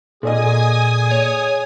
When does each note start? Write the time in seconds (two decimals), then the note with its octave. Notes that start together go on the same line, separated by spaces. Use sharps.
0.23 A#2 G#4 A4 D5 D#5 G#5 D#6
1.11 C#5